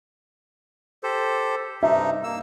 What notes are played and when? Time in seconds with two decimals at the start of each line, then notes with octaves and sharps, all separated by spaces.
1.03 G4 A4 C5
1.83 G2 C3 D#4 E5
2.24 A#3 E6